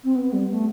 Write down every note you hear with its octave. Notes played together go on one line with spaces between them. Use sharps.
C4
B3
G3
A3